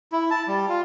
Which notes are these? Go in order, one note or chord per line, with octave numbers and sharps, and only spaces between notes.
E4
A5
G3
F4